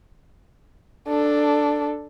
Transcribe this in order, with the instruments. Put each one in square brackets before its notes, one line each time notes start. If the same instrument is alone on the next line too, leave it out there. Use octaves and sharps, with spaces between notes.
[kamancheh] D4 A4